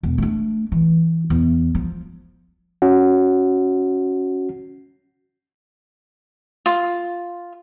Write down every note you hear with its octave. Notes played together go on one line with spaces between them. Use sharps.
E1
A3 D4
E3
E2
F3
C#4 F#4
F4